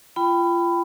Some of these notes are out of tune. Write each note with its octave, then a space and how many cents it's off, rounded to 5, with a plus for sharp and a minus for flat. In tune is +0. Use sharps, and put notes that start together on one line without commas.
F4 -25 G5 +0 B5 +15